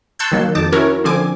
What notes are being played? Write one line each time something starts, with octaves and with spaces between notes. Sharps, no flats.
A5 C6 C#6 E6 F#6 G6
D#3 F#3 A#3
F2 D#4 A5 D6
C#4 E4 F#4 A#4 C#5
D3 F3 C4 G#5 D6